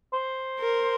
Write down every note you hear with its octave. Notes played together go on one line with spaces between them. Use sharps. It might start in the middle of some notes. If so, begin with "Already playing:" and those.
C5
A#4